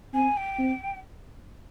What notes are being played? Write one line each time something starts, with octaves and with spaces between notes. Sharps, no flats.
C4 G#5
G5
C4